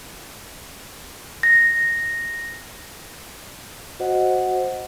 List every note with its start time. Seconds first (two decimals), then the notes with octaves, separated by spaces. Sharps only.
1.43 A#6
4.00 F#4 C5 D#5 F#5